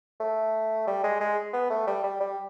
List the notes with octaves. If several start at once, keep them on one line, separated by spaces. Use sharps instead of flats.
A3
G3
G#3
G#3
B3
A3
G3
G3
G3